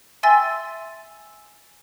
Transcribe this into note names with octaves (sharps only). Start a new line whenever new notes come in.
E5 G5 G#5 C6 E6 A6